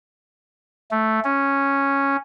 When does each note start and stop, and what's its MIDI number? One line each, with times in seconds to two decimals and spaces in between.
0.91 1.20 57
1.24 2.16 61